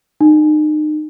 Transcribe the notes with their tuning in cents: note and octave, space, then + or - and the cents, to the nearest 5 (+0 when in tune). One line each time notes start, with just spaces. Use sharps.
D#4 -35